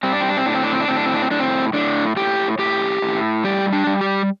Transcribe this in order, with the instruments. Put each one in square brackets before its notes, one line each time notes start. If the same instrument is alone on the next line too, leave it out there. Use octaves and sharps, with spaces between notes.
[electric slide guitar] G3 C4
D4
C4
D4
C4
A2 D4
C4
D4
C4
D4
A2 C4
D4
C4
D4
C4
A2 D4
C4
A2 D4
A2 G4
A2 G4
A2
G3 G4
D4
G3
G4